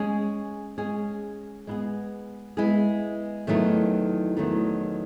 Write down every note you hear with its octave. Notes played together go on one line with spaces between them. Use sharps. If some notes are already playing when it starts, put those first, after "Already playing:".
Already playing: G#3 C#4 G#4
G#3 C#4 G#4
G#3 B3 E4 G#4
G#3 B3 E4 G#4
E2 D#3 F#3 A3 D#4
E2 D#3 F#3 A3 D#4